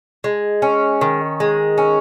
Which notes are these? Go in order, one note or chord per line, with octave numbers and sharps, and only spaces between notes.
G#3
C#4
D#3
G#3
C#4